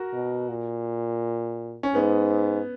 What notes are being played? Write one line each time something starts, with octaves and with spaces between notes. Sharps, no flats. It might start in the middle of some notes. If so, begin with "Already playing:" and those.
Already playing: F#4 A#4
B2
A#2
C#4
G#2 B3